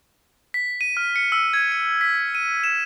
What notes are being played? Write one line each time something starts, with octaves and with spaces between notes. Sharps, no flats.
B6
D#7
F6
C#7
E6
G#6
C#7
B6
D#7
E7